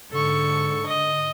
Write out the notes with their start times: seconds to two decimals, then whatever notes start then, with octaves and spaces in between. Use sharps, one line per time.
0.12 G#2 D3 A4 C#6
0.86 D#5